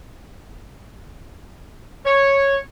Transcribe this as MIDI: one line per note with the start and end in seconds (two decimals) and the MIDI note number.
2.06 2.57 73